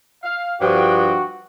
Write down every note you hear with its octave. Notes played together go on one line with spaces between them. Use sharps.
F5
G2 F3 F#4 G5